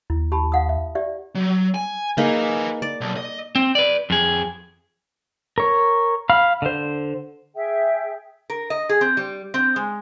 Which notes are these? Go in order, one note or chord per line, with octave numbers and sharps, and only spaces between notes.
D#2 E4
G4 A5 B5
F5 F#5 D#6
E5
G4 D5 E5
F#3
G#5
A#3 D#4 G#4 B4 G#5
D5
B1
D#5
C4
B4 D5
F2 G#4
A#4 C#5
F5 B5 F6
D3 C5
G#4 E5 G5
A#4
D#5
G#4
C4
G3
C4
G#3